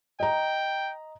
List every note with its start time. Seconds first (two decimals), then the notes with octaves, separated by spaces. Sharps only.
0.20 D#5 G5 A#5